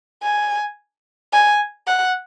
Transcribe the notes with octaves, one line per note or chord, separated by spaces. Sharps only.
G#5
G#5
F#5